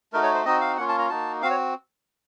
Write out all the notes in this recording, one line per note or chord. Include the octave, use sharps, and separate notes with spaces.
A3 D#4 F#4 A#4
C#5
C5
C4 D#4 F#4 D#5
F5
A#3 C#4 F4 F#5
A5
A#5
A#3 D#4 F#4 A5
C4 F#4 F5
C#5